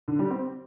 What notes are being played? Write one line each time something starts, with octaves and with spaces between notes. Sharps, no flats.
D3
G3
C4